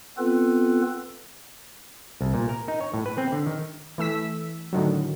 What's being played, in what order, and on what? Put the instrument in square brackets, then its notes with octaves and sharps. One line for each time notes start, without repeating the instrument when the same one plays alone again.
[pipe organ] B3 C4 F4 A4 B4
[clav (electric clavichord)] C2
A#2
A#4
D#4
C#5
A2
B4
C4
D3
D#3
[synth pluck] E3 A3 E6 B6
A2 D3 D#3 F#3